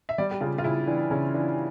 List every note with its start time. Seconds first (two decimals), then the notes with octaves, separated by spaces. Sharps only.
0.09 E5
0.18 G3 D5
0.31 G4
0.41 C#3 F4
0.58 F4
0.64 C#3 E4
0.87 E3 D4
1.10 C#3 C#4
1.34 E3 D4